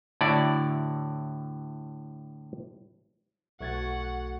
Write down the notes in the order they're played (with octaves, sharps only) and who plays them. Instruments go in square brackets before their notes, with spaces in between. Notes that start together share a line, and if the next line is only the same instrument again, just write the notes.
[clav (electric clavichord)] A2 D3 E4 F#4 D5
[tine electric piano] B1 G#6 A6 [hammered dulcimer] A3 F#4 [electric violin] F#5